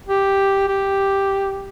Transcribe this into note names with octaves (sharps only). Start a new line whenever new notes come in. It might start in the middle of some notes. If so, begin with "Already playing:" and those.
G4
G4